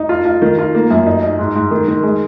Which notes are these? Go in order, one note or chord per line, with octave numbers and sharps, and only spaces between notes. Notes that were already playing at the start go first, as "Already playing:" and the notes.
Already playing: D#4
F4
F4
D#3
F4
A#3
F#2
D#4
D#4
G#2
G#2
D#3
D#3
G#3